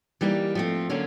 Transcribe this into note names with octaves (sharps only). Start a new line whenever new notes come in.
E3 G3 A#3 D#4 G4
F3 A3 C4
D3 F#3 A#3 C#4